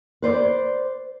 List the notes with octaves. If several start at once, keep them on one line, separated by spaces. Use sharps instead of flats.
B4 C5 D5